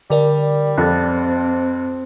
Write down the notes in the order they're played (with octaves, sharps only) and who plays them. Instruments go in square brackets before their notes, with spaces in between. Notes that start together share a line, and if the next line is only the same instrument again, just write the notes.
[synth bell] D3 A#4 D5 [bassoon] G3
[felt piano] F2 [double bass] C4 [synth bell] F#6 A6